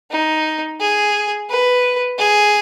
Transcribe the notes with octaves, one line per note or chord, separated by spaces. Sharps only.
D#4
G#4
B4
G#4